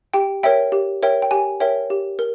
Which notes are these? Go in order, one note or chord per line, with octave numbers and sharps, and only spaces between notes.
G4 G5
A#4 C#5 E5 G5
G4
A#4 C#5 E5 G5
G5
G4 G#5
A#4 C#5 E5 G5
G4
A#4